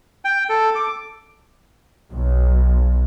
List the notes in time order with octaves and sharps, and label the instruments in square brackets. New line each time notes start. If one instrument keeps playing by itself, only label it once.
[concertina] G5
A4
D6
[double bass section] B1